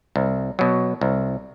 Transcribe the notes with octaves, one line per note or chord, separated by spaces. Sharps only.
C2
B2 F#3
C2